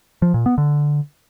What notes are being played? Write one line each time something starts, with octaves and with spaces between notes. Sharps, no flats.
F3
A#2
B3
D3